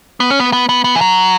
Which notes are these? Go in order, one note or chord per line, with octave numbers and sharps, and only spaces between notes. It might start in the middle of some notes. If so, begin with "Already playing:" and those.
B3
C#4
B3
B3
B3
B3
E3
F#3